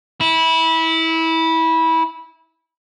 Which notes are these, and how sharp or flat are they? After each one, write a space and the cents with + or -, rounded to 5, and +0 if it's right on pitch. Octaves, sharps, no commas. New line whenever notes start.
E4 -20